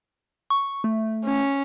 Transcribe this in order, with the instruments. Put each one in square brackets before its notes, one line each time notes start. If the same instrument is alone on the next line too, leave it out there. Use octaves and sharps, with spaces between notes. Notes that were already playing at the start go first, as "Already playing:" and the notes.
[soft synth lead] C#6
A3
[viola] C#4